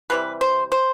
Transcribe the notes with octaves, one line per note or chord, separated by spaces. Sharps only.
C3 E3 G3 B4
C5
C5